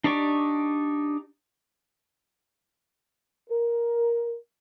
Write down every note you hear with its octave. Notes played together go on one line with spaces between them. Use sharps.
D4 D#4 G4 D5 C#6
A#4